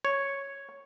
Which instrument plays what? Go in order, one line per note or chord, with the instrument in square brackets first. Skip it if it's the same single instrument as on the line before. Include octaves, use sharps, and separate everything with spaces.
[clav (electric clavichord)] C#5